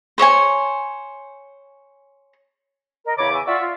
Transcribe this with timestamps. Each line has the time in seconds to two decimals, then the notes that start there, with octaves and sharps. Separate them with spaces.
0.18 C5 C#5 D#5 G#5
3.06 A#4 D#5
3.18 E2 C#3 C#5 B5 D6
3.33 E5 G#5 C#6
3.46 F4 F#4 D5 E5 C#6
3.59 F4